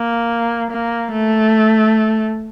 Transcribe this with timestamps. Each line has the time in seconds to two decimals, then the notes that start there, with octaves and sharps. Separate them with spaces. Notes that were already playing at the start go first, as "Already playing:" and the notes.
Already playing: A#3
0.71 A#3
1.12 A3